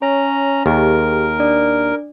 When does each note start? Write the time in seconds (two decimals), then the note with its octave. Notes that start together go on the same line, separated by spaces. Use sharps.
0.02 C#4 C#5 A#5
0.66 D#2 G4 G#4 A#4
1.40 D4 D5